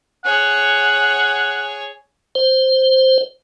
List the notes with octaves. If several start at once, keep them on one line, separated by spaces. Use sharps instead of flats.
G#4 C#5 F#5
C5